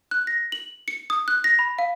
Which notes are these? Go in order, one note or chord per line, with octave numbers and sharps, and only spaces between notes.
F#6
A#6
F#7
C#7
D#6
F#6
A#6
B5
F5